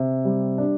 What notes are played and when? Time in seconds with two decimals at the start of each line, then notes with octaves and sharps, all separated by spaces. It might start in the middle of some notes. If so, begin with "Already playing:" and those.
Already playing: C3
0.25 G3
0.58 D4